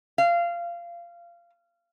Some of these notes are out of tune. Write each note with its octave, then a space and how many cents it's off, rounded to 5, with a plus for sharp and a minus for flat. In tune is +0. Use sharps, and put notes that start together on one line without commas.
F5 -20